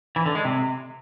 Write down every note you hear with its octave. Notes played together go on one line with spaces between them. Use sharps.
E3
D3
G#3
C3